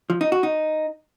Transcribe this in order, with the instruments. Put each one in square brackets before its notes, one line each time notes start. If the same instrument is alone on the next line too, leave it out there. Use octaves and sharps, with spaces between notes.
[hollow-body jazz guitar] F3
D#4
F#4
D#4